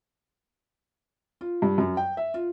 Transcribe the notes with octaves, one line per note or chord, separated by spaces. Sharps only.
F4
G2
F#2
G5
E5
F4